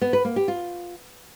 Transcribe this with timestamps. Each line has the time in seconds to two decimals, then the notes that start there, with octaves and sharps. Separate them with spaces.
0.01 B3
0.13 B4
0.25 A#3
0.36 G4
0.48 F4